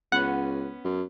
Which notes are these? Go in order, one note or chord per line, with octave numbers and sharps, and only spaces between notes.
C#2 B3 C#4 F#5
F#2